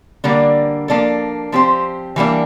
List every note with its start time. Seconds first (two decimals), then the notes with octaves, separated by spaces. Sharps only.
0.24 D3 G3 A#3 D4
0.88 F3 A#3 D4 A4
1.52 F3 C4 G4 C5
2.16 E3 G3 A#3 D4